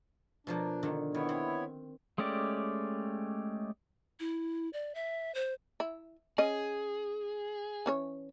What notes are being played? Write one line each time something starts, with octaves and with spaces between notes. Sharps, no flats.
B2 F3 A#3 D4
D3 D#3
D#3 B3 E4 C#5
C4
G#3 A3 C#4 G4 D5
E4
D5
E5
C5
E4
C#4 G#4 D#5
E3 C#4 C#5